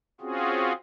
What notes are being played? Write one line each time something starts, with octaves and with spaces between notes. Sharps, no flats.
C4 C#4 F4 F#4 G#4